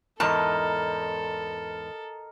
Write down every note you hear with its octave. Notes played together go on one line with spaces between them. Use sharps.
E2 G#2 A4 A#4 D#5 A5